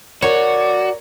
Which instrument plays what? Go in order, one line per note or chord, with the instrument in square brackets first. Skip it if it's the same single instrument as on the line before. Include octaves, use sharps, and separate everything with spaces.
[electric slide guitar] F#4 [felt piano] A#4 [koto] C#5 [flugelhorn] D5